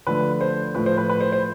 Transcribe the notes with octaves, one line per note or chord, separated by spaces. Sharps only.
D3 F3 A3 B4
C5
A2 F3 A3 B4
C5
B4
B4
C5
C5